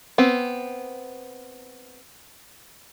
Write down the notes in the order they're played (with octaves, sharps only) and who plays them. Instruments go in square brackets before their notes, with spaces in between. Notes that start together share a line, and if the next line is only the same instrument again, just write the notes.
[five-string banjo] B3 C4